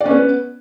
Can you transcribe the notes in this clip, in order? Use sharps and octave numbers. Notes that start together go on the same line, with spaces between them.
D5
C#4
B3